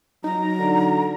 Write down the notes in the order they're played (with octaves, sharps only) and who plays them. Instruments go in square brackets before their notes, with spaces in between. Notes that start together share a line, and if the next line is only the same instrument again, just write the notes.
[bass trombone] F#3 [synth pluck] D#4 [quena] A#5
[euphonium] D3